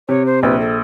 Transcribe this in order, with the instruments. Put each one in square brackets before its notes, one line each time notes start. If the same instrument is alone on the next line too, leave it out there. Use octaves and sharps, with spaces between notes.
[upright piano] C3 [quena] C#5
[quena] C5
[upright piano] A#1 [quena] B4
[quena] A4